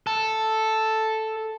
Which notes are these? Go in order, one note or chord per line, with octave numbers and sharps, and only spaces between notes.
A4